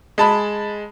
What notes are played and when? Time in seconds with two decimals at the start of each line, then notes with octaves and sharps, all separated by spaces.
0.18 G#3 A5 B5